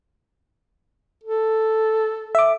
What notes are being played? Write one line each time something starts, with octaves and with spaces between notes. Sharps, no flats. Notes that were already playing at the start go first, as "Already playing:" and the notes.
A4
E5 D6